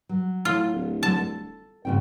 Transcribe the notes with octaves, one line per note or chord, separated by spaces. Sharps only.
F#3
A2 F4
D1
D3 F#3 A5
A4
G#1 G#2 C#3 G5